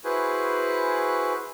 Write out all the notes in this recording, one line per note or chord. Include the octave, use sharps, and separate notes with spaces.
E4 F#4 G#4 B4 C5 G#5